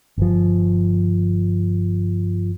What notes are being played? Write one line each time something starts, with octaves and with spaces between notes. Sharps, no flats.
G1 F3